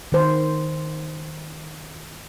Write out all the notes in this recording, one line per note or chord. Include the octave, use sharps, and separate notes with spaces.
D#3 C5